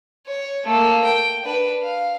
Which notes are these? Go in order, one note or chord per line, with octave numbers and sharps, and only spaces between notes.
C#5
A3 A#3
G5
D4 B4
F5